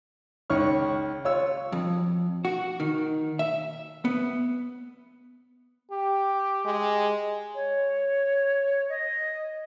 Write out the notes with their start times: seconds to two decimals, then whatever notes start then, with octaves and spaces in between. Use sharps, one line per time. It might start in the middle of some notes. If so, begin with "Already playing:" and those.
0.50 C#2 D#3 C#5 C#6 F6
1.25 F4 C#5 E6
1.72 F2
2.45 F#4
2.80 D#3
3.39 E5
4.05 B3
5.91 G4
6.65 G#3
7.55 C#5
8.89 D#5